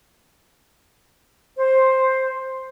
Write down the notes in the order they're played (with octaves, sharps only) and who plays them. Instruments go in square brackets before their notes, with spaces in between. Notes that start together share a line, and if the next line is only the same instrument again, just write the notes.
[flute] C5